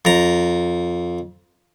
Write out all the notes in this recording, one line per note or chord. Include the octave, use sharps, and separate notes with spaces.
F2 A#5